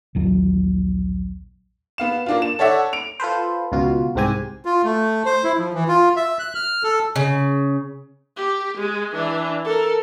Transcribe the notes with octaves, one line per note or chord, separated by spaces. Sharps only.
A#1 D#2 F#3
B3 F5 E7
A#3 D4 F4
E7
A4 C#5 D5 E5 F#5
D7 F7
F4 A4 B4 C5
C#2 B2 F4 F#4
C2 G#2 C4 G4 G#5
F4
A3
C5
E4
F3
E3
F4
E5
F#6
F6
A4
C#3
G4
G#3
E3 D4
A4 A#4